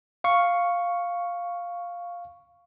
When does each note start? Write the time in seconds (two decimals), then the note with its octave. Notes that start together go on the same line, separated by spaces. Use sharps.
0.24 F5 C#6